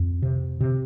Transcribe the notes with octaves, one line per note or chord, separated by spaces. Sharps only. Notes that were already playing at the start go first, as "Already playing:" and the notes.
Already playing: F2
C3
C3